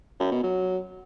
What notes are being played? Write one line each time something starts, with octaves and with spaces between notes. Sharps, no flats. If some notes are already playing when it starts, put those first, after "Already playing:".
F#2
B2
F#3